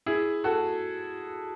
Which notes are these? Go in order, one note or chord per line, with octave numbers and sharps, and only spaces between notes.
E4 G#4
F#4 A4